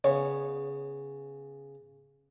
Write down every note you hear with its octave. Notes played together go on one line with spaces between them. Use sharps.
C#3 B3 C#5 C#6